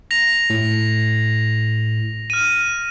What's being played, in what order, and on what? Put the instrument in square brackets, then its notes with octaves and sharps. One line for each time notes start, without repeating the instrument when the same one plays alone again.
[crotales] A#6 F7
[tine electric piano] A2
[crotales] F6 D#7